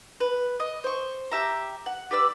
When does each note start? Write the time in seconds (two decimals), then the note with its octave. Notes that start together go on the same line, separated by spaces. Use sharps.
0.20 B4
0.60 D#5
0.84 C5 C#6
1.31 G4 E5 A#5
1.86 F#5
2.11 G4 B4 D5 E6